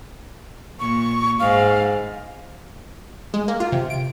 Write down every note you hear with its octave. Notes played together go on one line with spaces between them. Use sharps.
A#2 C#6
G#2 F5
G#3
A#3
F4
C3
D7